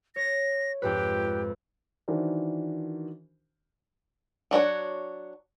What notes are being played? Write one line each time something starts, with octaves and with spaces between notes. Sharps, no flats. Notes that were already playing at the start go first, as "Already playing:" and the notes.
C#5 A#6
F2 G#2 G4 B4
D#3 E3 D4 F#4 A#4 C5
F#3 D4 F#4 C#5